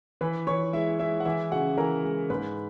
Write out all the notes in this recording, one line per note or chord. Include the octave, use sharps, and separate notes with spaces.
E3 B4 B5
E3 C#5 C#6
G#3 E4 E5
G#3 E4 E5
F#5
E3 E4 E5
C#3 F#4 F#5
E3 A#4 A#5
G#3
G#2 B4 B5